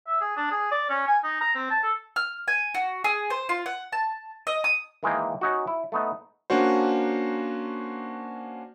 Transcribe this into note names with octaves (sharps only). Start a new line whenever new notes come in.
E5
G#4
D4
G#4
D5
C#4
G#5
D#4
A#5
C4
A5
A4
F6
G#5
F#4
G#4
C5
F4
F#5
A5
D#5
D#6
D#3 E3 G#3 A#3 G5
C#4 D#4 F#4
E4
A3 B3 D#4
A#3 C#4 D4 F#4 C5